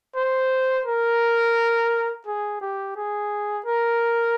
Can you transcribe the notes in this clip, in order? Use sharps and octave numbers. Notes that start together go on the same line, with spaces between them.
C5
A#4
G#4
G4
G#4
A#4